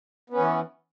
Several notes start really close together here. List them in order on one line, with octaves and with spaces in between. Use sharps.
B3 C#4 E3